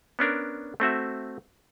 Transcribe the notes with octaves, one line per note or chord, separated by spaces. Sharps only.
B3 C#4 D4 A#4
A3 C4 F#4 E5